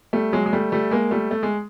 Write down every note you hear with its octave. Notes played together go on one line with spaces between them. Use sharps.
G3 A3
F#3 G#3
G#3
G3 A3
G3 A3
G#3 A#3
G3 A3
A3
G#3